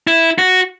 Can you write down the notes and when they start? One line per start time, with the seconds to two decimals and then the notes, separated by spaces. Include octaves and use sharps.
0.07 E4
0.38 F#4